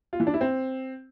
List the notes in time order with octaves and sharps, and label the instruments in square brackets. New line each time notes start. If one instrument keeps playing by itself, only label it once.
[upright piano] F4
E3
D4
E4
C4